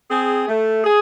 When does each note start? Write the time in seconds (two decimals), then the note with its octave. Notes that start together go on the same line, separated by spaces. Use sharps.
0.10 C4 G#4
0.47 A3
0.84 G#4